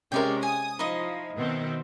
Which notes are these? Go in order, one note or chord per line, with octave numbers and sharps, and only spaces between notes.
C3 G#3 C#4 A#4 D5 G5
G#5 D#6
F3 D#4 E4 D#5
B2 D#3 C4